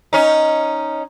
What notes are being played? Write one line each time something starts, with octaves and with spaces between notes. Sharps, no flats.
C#4 D#4